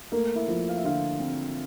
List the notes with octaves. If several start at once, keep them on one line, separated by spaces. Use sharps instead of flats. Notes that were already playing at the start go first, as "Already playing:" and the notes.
A3 A#3 A#4
E4 E5
F3
F5
E5
D3 F4 F5
C4